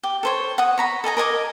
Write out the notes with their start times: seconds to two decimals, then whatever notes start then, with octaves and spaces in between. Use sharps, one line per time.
0.03 G4
0.23 A4 C5 C#5
0.58 F#5 D#6
0.78 C#5 A#5 B5
1.04 A4 D#5 G#5 A#5
1.17 A#4 D#5 G#5 D6